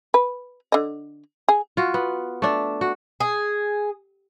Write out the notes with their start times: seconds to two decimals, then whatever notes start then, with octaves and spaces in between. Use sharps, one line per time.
0.14 B4
0.72 D3 D#5
1.48 G#4
1.77 F4 F#4
1.94 B3
2.42 A3 D4
2.81 F#4
3.20 G#4